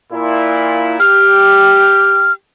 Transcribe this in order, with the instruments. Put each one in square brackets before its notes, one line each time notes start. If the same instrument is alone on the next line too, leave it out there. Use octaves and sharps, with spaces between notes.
[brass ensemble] A#2 E4
[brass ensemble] G4 [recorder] F6